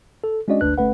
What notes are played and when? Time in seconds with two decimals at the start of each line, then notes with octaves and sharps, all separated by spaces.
0.24 A4
0.48 G#3 C#4 D4 F#4 D5 D#5
0.61 G1 D2 A3 D4 B4 F#6
0.78 G1 A3 C#4 B4 F#5